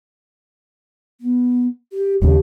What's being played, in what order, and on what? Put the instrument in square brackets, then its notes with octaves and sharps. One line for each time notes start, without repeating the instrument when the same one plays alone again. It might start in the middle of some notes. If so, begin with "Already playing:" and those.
[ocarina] B3
G4
[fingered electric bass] D#2 C#3 [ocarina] G4